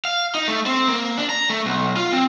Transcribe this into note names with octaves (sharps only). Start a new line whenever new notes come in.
F5
D#4
A3
C4
A#3
D4
A#5
A3
B1
F4
C4